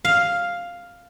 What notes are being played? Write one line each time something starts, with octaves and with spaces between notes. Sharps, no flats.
F5